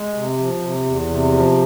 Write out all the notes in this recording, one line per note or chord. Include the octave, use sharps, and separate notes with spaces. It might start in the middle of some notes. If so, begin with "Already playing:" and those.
Already playing: G#3
C3
F3
C3
E2
C3
F3